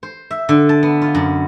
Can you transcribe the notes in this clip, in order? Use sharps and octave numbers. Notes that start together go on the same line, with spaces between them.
C5
E5
D3
A5
B3
F4
F#2